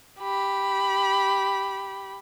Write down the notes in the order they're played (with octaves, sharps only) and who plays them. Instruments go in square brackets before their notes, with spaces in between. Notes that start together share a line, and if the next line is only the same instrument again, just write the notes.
[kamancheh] G4 B5